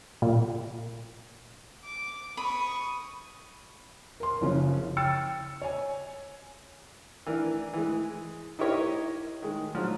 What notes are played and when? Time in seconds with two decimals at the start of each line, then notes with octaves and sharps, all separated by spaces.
0.22 A#2
1.85 D6
2.37 B5 C#6 D#6
4.20 A#4 C6
4.41 F#1 C#3 F3 C#4
4.97 G5 E6 A6 C#7
5.62 C#5 G#5
7.27 E3 D4 A#4
7.73 E3 G#3
8.59 D#4 E4 G4 A#4 C#5 D#5
9.42 D#3 G#3
9.75 F3 F#3